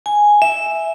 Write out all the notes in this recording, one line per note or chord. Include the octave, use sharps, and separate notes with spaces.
G#5
E5